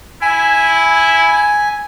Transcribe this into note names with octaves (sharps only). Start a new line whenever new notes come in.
E4 G#5